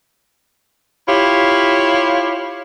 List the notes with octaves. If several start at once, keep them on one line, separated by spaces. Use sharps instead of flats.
E4 F4 G4 C#5